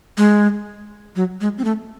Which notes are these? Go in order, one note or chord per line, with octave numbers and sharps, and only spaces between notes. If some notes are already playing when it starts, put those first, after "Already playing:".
G#3
F#3
G#3
C4
A3